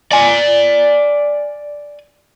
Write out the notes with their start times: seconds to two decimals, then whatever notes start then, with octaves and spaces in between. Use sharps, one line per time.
0.11 D5 G#5